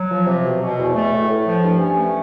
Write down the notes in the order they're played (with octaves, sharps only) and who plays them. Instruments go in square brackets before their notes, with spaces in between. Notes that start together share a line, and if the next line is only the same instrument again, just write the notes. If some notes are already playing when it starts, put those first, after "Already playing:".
Already playing: [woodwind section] F#3
F3
C3
B2
B2
E2
A3
A2
A2
F3
G2
C#4
A3